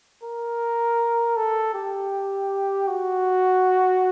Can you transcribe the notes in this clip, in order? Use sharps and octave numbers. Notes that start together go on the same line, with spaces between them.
A#4
A4
G4
F#4